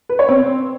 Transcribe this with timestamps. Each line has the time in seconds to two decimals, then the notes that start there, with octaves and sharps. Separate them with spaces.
0.09 B4
0.19 C#5
0.29 C4